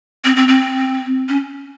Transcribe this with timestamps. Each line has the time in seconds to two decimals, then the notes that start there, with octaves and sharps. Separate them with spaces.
0.25 C4
0.36 C4
0.48 C4
1.29 C#4